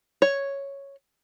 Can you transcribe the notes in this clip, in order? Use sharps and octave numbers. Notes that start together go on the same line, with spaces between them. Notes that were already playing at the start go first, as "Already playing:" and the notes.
C#5